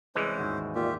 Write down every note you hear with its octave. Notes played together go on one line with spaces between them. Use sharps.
C2 E3 G#3 C#4 C5
D#2 G#2 F#4
A#2 F4 G4 E5